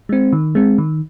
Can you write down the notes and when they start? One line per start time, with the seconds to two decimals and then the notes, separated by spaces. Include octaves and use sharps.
0.09 G#3 C4
0.33 D#3
0.55 G#3 C4
0.78 D#3